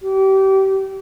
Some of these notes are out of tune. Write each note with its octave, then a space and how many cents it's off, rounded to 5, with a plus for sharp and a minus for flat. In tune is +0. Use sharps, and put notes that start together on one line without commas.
G4 -30